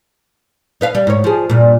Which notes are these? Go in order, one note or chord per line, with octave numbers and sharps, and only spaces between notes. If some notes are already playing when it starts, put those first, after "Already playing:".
D#4 B4 F5
G3
G#2 C#5
F3 G#4
G2 A#2